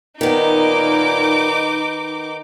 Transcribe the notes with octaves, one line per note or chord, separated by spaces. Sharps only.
A#2 D#3 B3 D#4 D6